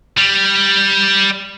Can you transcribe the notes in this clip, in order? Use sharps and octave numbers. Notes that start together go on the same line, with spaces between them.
G3